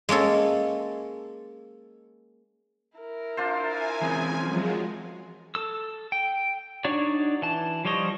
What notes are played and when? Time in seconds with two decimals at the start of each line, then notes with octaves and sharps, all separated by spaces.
0.09 G#3 A#3 C#4 A4
2.98 E4 A#4
3.37 D4 F4 C5
3.68 G#5
4.01 E3 C4 C#4 G#4
4.42 F3 F#3 G#3
5.55 A4 E6
6.12 G5
6.84 D4 D#4 F#4 C#5 D5
7.42 E3 A5
7.85 F3 G3 C5 C#5 D#5